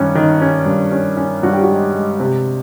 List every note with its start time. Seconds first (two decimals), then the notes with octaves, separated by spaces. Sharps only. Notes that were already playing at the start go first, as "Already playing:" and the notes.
Already playing: G2 D#3 C#4
0.15 D#3
0.41 C#4
0.66 G2
0.92 C#4
1.17 C#4
1.43 G2 F#4
1.53 G4
1.63 F#4
1.69 G#3
1.94 G#3
2.20 C3